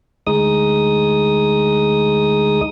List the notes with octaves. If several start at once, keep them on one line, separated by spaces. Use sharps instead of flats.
D2 G#3 D#4 D#6